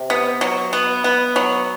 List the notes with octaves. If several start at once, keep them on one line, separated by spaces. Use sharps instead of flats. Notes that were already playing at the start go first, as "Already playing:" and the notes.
Already playing: C3
B3
F#3
B3
B3
F#3